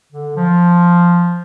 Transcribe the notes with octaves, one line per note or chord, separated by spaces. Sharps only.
D3
F3